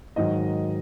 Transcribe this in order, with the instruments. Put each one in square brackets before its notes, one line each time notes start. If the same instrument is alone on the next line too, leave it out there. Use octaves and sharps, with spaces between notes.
[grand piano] G#2 D#3 F#3 D#5